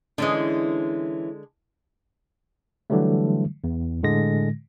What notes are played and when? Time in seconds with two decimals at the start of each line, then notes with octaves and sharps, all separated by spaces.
0.18 D3 E3 G#3 C#4 D4
2.90 D3 E3 F#3 G3 A3
3.64 E2
4.03 A2 D3 G#3 A#6